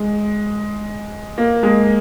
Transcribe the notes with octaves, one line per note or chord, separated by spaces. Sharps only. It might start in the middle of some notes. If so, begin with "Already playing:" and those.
Already playing: G#3
A#3
G#3